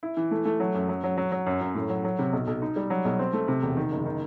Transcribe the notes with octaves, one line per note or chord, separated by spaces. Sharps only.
E4
E3
A3
A3
F#3
F#2
F#3
F#3
F#3
F#3
F#2
F#2
A2
F#3
F#3
C3
B1
B1
D#4
G3
F#3
B1
C4
A3
C3
E1
D#3
F#1
D#3